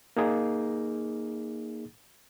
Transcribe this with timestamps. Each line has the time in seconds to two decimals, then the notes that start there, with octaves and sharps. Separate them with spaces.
0.17 A#3 D#4 G#4